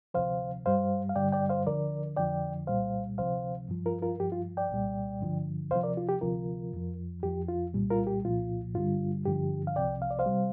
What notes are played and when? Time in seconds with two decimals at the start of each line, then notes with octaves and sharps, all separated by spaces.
0.14 D2 C3 F3 C5 F5
0.66 G2 G3 C5 F5
1.09 F5
1.16 G2 D3 G3 D5 G5
1.32 D5 G5
1.49 C5 F5
1.67 D2 D3 F3 A#4 D5
2.17 F2 D3 F3 D5 G5
2.67 C2 A#2 G3 C5 F5
3.18 D2 C3 F3 C5 F5
3.69 G2 F3
3.86 F4 A#4
4.02 F4 A#4
4.20 G2 F3 G4
4.32 F4
4.57 D5 G5
4.70 C2 A#2 G3
5.21 G2 D3 F3
5.71 D2 C3 F3 C5 F5
5.83 A#4 D5
5.97 F4
6.09 G4
6.21 D2 C3 F3 F4 A#4
6.73 F2 F3
7.23 F2 F3 G4
7.49 F4
7.73 C2 A#2 G3
7.90 F4 A#4
8.07 G4
8.24 C2 A#2 F3 F4
8.74 G2 D3 G3 F4
9.26 G2 D3 F3 G4
9.67 F5
9.76 C2 C3 F3 D5 G5
10.02 F5
10.11 D5
10.19 C5 F5
10.26 C3 G3